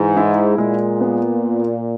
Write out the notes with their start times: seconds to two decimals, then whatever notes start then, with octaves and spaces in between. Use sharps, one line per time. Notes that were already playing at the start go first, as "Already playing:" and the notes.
Already playing: G#2 E3
0.17 E4
0.58 A#2 G#3
1.01 B3